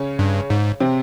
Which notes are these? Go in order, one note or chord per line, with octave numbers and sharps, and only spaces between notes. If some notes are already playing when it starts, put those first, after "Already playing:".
Already playing: C#3 C#4
G2
G#2
C3 C4